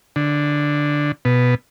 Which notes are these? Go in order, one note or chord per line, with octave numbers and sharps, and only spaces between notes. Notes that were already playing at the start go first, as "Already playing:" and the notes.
D3
B2